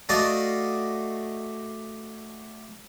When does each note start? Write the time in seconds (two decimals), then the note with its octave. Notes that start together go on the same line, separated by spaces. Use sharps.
0.09 A3 F#4 D5 D#5 F5